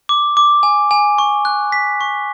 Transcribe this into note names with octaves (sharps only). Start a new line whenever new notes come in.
D6
D6
G#5
G#5
C#6
F#6
B6
C#6